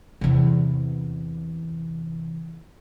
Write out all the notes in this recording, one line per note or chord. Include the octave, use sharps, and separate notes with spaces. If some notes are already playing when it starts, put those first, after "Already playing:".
E2 C3